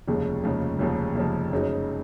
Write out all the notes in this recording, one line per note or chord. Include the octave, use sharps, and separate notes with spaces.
F1 D#2 C#3 F3 G#3
F1 D#2 C#3 F3 G#3
F1 D#2 C#3 F3 G#3
F1 D#2 C#3 F3 G#3
F#1 F#2 C#3 G#3 D#4